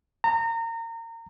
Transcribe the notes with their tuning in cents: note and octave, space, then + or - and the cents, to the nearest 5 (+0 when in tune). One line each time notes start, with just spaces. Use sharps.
A#5 -30